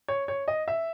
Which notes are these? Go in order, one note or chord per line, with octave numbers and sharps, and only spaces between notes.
C#5
C#5
D#5
E5